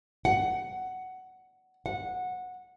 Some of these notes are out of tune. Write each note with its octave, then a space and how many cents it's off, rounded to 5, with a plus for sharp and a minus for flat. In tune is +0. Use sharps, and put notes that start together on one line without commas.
F#5 +10
F#5 -15